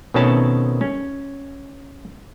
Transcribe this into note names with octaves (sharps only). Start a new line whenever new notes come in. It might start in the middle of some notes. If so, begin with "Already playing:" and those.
B2 D#3 A3 C4 C#4 A5
C#4